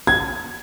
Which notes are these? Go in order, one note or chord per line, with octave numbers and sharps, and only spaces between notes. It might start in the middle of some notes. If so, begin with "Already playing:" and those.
G#6